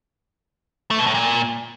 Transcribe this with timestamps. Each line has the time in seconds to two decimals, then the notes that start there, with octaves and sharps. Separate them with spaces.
0.91 A3
0.99 B2
1.06 A2
1.14 A#2